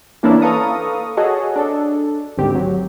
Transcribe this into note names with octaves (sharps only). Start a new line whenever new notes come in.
E3 A#3 C#4 D4 E4
A4 B4 F5 A#5 C#6 D#6
F#4 G#4 A4 C#5 D#5
D4 A4
G#1 D2 C4 G4
F#3